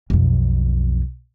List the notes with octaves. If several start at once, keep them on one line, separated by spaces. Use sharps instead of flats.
B1 F2